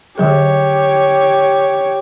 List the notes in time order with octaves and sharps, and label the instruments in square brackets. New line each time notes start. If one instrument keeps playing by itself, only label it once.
[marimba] D3 F#3 G#4 [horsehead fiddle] G4 C#5